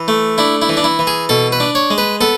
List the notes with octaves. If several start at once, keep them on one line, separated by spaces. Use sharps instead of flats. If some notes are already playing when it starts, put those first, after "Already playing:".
Already playing: E3
A3
D4 E4
E4
E3
D4
E4
E3
G#4
B2 A4
B4
D4
C#5
G#3
B4
B3 A4